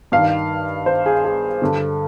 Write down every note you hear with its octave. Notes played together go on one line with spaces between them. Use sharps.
G2 D#3 F5
C5
G#4
G#4
G2 D3